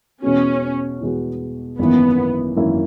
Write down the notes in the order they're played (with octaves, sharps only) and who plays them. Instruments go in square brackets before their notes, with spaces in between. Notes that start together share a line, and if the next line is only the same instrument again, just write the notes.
[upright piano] E2 B2 G#3 B3 F#4 [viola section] C#4
[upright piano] E2 B2 G#3 B3 F#4
[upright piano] G#1 F#2 E3 A#3 E4 [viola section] B3
[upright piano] G#1 F#2 E3 A#3 E4